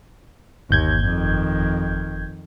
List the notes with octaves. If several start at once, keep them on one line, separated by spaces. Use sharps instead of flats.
G1 D#2 G6 G#6
F2 D#3